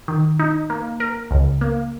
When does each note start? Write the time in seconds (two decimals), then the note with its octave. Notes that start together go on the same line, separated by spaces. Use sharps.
0.08 D#3
0.39 D#4
0.70 A#3
1.00 A#4
1.31 C#2
1.61 A#3